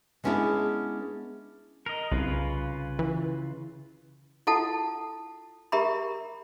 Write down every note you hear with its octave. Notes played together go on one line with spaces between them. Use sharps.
G#3 B3 C#4 D4 E4 G#4
A#4 D#5
C2 C#3 F4 B4
E3
E4 F4 A4 F#5 A5
G4 A#4 E5 A#5 B5